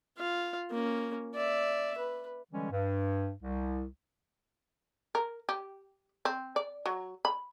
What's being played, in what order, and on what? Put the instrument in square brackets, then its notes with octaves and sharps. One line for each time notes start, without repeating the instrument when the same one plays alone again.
[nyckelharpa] F4 F5
A#3 C#4
D5 E5
B4
[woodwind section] D3 E3 G3 G#3 C#4
G2
C2
[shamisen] A#4
G4
C4
D5
F#3
B5